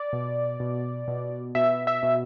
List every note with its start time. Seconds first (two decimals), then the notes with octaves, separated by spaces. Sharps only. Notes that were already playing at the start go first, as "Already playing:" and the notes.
Already playing: D5
0.13 B2
0.60 B2
1.08 B2
1.55 B2 E5
1.87 E5
2.03 B2